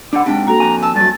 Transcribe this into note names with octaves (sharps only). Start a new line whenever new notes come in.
B2 G3 D4 F#5
G#2 C3 D4 G5
A#3 F#4 A4 A#5
F2 G#5
A5 E6
G2 F#3 G#5 A6